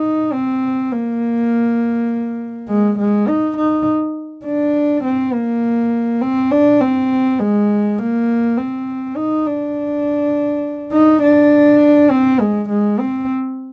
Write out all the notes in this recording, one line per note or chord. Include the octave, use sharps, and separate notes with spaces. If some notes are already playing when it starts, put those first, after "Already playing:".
Already playing: D#4
C4
A#3
G#3
G#3
D#4
D#4
D4
C4
A#3
C4
D4
C4
G#3
A#3
C4
D#4
D4
D#4
D4
C4
G#3
G#3
C4